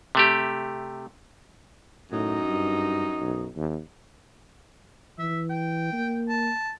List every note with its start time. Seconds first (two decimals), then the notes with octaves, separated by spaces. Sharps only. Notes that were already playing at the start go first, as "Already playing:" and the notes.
0.15 C3 A3 G4
2.12 F#2 A2 D#4
2.49 G2
3.21 B1
3.56 D#2
5.18 E3 E5
5.50 G5
5.93 A#3
6.29 A5